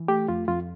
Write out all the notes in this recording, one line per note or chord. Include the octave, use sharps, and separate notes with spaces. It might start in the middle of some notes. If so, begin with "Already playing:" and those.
Already playing: E3
A3 G4
F2 F4
F2 F4